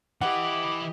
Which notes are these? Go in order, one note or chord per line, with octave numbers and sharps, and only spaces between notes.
E3 E4 G4 D#5 F#5 D6